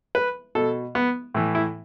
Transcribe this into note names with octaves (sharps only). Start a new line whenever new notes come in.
B4
B2 A4
B3
A2 E3
E4